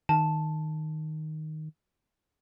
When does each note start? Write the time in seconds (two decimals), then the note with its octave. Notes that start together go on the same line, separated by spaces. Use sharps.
0.09 D#3 A5